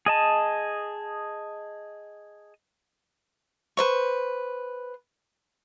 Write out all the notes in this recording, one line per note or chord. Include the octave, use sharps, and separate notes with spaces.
G#4 D#5 A5
B4 C5 C#6